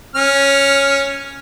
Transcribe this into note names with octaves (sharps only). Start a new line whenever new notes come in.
C#4 F6